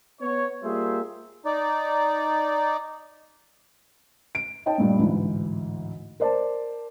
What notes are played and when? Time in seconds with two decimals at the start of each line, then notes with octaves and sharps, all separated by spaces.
0.20 B3 C#5
0.63 G3 A#3 F4 G#4 C5 E5
1.45 D#4 D5
4.35 D7
4.66 D#4 C#5 D#5 G5 A5
4.78 G2 A#2 G3
4.99 A1 D2 G#2 E3
6.20 A#4 C5 D5 A5